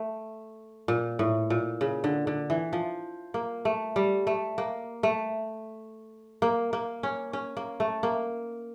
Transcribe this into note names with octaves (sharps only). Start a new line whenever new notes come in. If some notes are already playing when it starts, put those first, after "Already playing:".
Already playing: A3
A#2
A2
A#2
C#3
D3
D3
E3
F3
A#3
A3
G3
A3
A#3
A3
A#3
A#3
C#4
C#4
A#3
A3
A#3